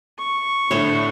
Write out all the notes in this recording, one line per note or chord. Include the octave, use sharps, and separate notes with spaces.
C#6
A2 D3 A3 C5 C#5